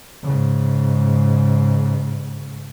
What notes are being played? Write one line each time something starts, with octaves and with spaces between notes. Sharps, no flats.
G#2 C#3